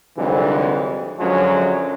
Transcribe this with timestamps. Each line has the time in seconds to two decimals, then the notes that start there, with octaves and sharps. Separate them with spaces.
0.17 C2 F2 G#2 D3 E3 F#3
1.19 F#2 D3 F3 F#3 G#3 C#4